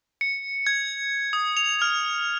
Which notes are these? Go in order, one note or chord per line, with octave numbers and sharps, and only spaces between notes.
C#7
G#6
D#6
F7
F6